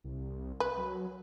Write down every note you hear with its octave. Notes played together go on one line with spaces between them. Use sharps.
C2
B4
F#3